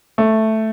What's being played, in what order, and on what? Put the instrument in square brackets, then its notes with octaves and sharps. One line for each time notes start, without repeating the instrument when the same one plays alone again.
[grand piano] A3